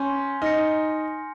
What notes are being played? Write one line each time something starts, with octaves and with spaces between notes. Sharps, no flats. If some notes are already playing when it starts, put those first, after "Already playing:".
Already playing: C#4 G#5 C6 G6
D#4 F6 A#6 C#7